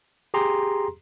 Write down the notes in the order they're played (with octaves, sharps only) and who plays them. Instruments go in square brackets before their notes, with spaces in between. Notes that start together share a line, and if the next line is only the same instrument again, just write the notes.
[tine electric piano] G4 G#4 A#5 C6